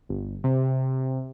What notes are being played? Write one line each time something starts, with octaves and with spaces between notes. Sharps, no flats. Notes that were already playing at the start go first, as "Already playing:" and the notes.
G1
C3